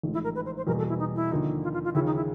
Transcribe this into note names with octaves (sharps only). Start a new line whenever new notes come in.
A1 G#2 F3 A3
E4
A#4
B4
C5
C5
E2 B2 G3 A#3 A#4
A4
E4
D#4
E4
D#2 D3 F3 A#3 D#4
F4
F4
F4
D#2 C#3 F3 E4
D#4
E4